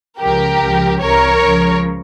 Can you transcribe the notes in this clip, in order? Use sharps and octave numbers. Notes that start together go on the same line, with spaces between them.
C#2 C#3 F3 G4 A#4
C#2 C#3 F3
C2 C3 E3 A#4 C#5
C#2 C#3 F3